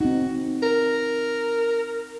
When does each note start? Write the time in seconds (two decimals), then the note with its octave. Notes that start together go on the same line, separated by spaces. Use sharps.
0.01 C4 D#4 F#4
0.63 A#4